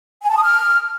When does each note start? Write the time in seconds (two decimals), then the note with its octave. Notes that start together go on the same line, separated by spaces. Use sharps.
0.23 G#5
0.29 A5
0.36 D#6
0.43 F6